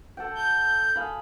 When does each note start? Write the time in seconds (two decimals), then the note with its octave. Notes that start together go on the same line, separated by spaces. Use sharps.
0.17 A4 F#5 G5
0.35 G6
0.95 G#4 F5 B5